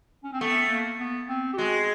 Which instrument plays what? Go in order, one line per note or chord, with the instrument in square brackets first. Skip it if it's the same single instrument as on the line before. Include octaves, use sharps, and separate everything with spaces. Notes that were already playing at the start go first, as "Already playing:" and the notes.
[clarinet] C#4
C4
[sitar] A3 [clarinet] B3
[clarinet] A#3
B3
C4
G4
[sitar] G#3 [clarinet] F#4